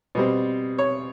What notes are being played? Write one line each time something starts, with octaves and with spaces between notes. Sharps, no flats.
B2 G3 C4
C#5